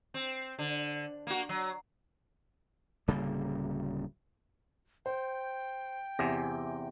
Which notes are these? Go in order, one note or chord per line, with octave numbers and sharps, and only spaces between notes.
C4
D3
A#3 F#4
F#3
D1 C#3 G3 A#3
C5 G5
E2 C3 G#5 A#6